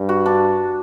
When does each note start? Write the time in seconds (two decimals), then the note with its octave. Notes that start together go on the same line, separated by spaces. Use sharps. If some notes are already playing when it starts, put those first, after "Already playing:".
Already playing: G2
0.09 F#4
0.26 D4